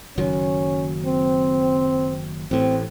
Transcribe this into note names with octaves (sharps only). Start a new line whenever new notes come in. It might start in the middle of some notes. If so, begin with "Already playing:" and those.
F#1 D#3 F#3 C#4
C4
A1 A2 C4